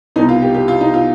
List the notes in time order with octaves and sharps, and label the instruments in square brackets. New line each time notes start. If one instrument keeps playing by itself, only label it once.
[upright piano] C2 D#4
B2
F4
G4
G4
F4
D#4
F4